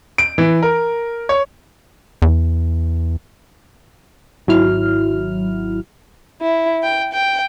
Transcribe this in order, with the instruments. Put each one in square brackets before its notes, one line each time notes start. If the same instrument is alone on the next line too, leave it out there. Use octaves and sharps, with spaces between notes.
[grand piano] D7
E3
A#4
C#5
[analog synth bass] E2
[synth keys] G#1 F#3 E4 F6
[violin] E4
G5
G5